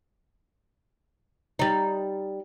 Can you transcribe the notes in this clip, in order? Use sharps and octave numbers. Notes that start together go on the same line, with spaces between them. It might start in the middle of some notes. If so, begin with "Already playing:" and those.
G3 D#4